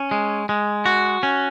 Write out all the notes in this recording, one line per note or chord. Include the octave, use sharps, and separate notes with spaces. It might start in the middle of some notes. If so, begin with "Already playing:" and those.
Already playing: C#4
G#3
G#3
F#4
C#4